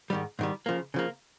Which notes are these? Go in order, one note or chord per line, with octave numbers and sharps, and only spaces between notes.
G#2 D#3 G3
G#2 D#3 G3
C#3 F3 A#3
C#3 F3 A#3